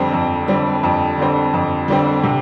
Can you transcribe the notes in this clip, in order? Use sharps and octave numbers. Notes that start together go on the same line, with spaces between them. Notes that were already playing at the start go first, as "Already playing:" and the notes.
Already playing: F2 D3 G3 C4
F2
D3 G3 C4
F2
D3 G3 C4
F2
D3 G3 C4
C3